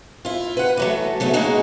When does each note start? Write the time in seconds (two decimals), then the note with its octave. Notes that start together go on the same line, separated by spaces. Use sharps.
0.25 E4 F4
0.57 B4 F#5
0.77 E3 F#3 A3
1.20 C#3 F#3 A3 B3
1.33 C#3 G#3 A#3 D#4 F#4 G#4